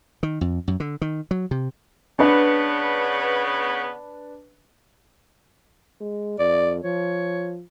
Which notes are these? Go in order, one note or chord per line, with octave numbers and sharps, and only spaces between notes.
D#3
F2
F#2
D3
D#3
F#3
C3
C#3 B3 D4 B4
G#3
F2 D5
F3 C#5